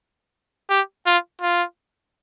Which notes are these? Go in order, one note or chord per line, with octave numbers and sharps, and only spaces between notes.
G4
F4
F4